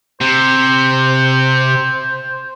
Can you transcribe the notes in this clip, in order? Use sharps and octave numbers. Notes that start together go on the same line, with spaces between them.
C3 C5